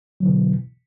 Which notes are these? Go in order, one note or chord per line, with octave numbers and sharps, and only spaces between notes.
B2 D3 E3 F#3